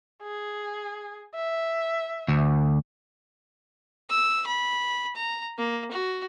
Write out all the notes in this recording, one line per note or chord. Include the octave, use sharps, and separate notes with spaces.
G#4
E5
D2
E6
B5
A#5
A#3
F#4